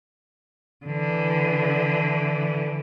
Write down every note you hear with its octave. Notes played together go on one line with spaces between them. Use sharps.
D3 E3